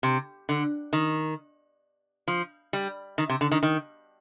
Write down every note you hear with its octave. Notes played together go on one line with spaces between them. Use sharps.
C3
D3
D#3
F3
G3
D#3
C3
D3
D#3
D#3